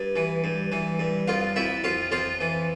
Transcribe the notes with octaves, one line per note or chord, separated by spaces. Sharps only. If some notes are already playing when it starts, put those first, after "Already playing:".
Already playing: G2
E3
G2
E3
G2
F2 F4 F5
F2 E4 E5
F2 F4 F5
F2 F4 F5
E3